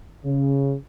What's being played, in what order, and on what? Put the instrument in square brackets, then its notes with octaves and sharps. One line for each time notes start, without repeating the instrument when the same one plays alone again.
[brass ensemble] C#3